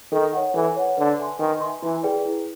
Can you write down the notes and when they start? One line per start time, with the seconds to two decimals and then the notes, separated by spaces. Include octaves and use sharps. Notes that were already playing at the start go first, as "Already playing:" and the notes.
0.12 D#3 A4
0.33 C#5 F#5
0.54 E3 A4
0.77 C#5 F#5
0.97 D3 B4
1.19 E5 G#5 C6
1.39 D#3 B4
1.61 E5 G#5 C6
1.82 E3 E4
2.03 G#4 B4 D5 G5
2.25 E4